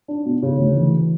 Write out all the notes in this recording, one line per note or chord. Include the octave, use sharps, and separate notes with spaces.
D4
B2
C#3
D2
E3